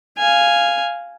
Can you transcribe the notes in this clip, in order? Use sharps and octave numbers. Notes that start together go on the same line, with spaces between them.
F5 G#5